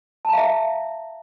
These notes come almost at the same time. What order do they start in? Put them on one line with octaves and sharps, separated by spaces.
A5 A#5 F5 E5